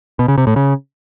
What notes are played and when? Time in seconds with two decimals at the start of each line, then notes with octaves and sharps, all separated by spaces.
0.19 B2
0.28 C#3
0.38 C3
0.47 A2
0.56 C#3